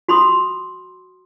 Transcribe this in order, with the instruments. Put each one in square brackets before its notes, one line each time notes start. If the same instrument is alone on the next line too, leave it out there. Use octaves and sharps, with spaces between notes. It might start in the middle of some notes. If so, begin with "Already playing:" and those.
[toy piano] F#4 B5 C6 D#6